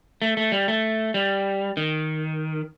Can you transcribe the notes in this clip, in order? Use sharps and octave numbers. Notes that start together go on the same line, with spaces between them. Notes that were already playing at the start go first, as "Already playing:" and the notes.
A3
A3
G3
A3
G3
D#3